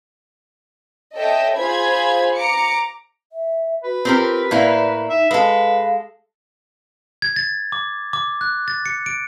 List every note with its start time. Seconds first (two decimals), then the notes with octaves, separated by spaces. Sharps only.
1.15 A4 C#5 D#5 E5 G5
1.57 F4 G#4 C5 B5 G#6
2.35 A#5 D6 C#7
3.32 E5
3.84 F#4 B4
4.05 C4 F4 G4 A#4
4.51 A2 A#3 E4 D5
5.10 D#4 E5
5.31 G#3 A4 B4 F5
7.22 G#6
7.36 A6
7.72 D6
8.13 D6
8.41 F#6
8.68 A6
8.86 C#7
9.06 D7